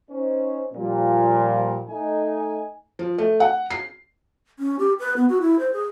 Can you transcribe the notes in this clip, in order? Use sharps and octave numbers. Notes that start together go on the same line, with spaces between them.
C#4 D#4 C5
A#2 F3 G3
A3 D#4 G#5
F3
A3
F#5
C7
C#4
G4
B4
B3
F#4
E4
C5
G#4